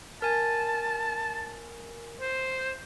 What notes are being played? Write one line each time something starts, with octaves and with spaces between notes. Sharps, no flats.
A#4 G#5 A5
C5